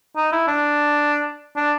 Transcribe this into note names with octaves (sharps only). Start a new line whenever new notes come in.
D#4
E4
D4
D4